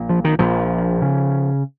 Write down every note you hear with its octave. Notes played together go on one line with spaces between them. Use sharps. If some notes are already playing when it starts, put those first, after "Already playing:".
Already playing: A#1 A#2
F3
D#3
A#1 A#2 F3
C#3